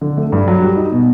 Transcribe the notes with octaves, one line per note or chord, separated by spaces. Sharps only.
D3
A3
G2
F#3
G3
D#4
B2